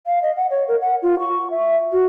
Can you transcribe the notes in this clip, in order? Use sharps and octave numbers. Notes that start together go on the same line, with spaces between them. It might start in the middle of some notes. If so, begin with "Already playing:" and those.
F5
D#5
F#5
C#5
A#4
F#5
F4
C#6
E5
F#4